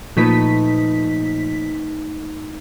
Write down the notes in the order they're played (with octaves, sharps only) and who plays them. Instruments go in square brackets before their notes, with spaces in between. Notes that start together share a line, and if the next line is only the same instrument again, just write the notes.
[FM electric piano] A#2 F3 B6 [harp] A3 D#4 B4